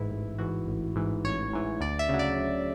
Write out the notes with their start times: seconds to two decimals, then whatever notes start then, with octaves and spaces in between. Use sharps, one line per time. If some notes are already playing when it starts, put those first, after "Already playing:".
Already playing: A1 G#2 E3 E4
0.11 A1
0.39 G#2 E3 F#4
0.67 A1
0.96 G#2 E3
1.24 A1 C#5
1.53 G#2 E3
1.80 D2 D5
1.99 E5
2.09 C#3 F#3
2.19 D5
2.37 D2